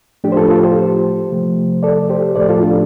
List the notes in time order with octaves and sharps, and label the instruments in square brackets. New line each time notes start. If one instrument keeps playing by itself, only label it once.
[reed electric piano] A2 F3 A3 D4 G4
C5
F4 A4
F4 A4
G4 C5
C3 F3 A3
A4 D5
G4 C5
A2 F3 A3 A4 D5
F4 A4
D4 G4